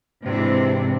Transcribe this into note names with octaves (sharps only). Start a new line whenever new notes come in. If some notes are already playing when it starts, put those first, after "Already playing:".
G#2 C3 E3 C4 D4